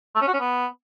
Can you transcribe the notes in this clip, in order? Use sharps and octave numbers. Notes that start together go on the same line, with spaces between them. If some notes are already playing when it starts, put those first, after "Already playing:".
A3
C#4
F#4
C#4
B3